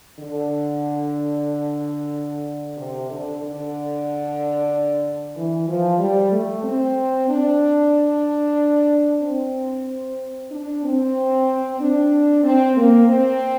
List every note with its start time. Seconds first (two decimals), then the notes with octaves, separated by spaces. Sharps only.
0.18 D3
2.77 C3
3.09 D3
3.41 D3
5.35 E3
5.67 F3
5.99 G3
6.31 A3
6.63 C4
7.28 D4
9.22 C4
10.50 D4
10.83 C4
11.80 D4
12.43 C4
12.76 A#3
13.08 C4